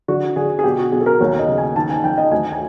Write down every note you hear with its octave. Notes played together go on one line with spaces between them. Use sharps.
D3 F#4
D3 G#4
G#4
B2 G4
F#4
B2 G#4
A4
A#4
D#2 C#5
D#5
C#3
G#5
D#3 A5
G#5
D#3 G5
D#5
D2 G#5
G#5